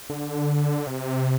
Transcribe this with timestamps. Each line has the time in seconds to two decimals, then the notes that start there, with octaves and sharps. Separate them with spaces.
0.10 D3
0.87 C3